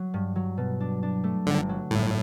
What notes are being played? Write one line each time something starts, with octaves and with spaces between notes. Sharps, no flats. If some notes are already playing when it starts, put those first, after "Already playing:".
Already playing: F#3
G2
F#3
B2
D4
D4
A3
G1 D3
F#3
G1 A2